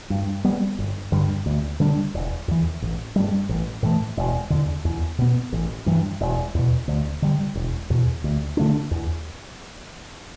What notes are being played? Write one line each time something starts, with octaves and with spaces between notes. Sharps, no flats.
G2
G3 B3
G1
G2 D3 G3
D2
D3 G3 D4
E1
E2 E3
A1
G2 G3
A1
A2 E3 A3
E1
E2 D3
E2
B2 B3
A1
G2 E3
E1
E2 B2
D2
D3 G3
E1
E2 B2
D2
D3 A3 D4
E2